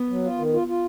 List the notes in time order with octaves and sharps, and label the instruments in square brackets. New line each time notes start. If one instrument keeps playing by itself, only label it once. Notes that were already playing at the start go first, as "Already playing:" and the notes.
Already playing: [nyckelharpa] B3
[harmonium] F#3
F4
D#3
F4
F4